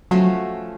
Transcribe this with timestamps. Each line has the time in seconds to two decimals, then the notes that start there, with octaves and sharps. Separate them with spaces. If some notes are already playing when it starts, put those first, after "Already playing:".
0.11 F3 F#3 A3 C#4 F#4